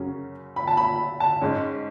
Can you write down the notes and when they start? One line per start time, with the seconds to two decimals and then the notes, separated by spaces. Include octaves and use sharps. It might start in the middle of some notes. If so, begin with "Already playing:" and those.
Already playing: F#2 C#3 F#3 C#4
0.56 B5
0.67 A5
0.77 B5
1.20 A5
1.41 G#2 G#3 C#4